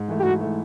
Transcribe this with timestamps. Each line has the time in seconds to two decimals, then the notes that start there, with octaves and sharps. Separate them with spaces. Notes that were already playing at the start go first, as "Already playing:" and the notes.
Already playing: G#2
0.08 E3 A3
0.20 G4
0.24 G#2 F#4
0.41 E3 A3